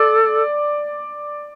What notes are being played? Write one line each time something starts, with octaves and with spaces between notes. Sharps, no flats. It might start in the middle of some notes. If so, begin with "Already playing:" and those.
Already playing: A4 D5